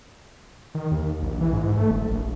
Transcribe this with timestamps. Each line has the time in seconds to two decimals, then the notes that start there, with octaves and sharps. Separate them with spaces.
0.75 D#3
0.91 D#2
1.22 A#1
1.41 E3
1.53 G#2
1.77 A3
1.91 F#1
2.08 A#1